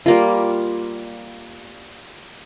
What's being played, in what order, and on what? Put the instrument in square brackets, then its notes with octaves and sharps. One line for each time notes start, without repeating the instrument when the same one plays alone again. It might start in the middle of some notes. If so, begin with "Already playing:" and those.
[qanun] G3 A#3 F4